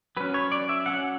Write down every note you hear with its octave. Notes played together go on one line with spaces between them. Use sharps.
F#3 C#4 B4
C#5
D5
E5
F#3 C#4 F#5